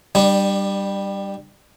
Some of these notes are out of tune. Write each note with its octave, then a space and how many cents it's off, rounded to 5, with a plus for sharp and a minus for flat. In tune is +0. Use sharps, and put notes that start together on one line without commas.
G3 +0 D4 +30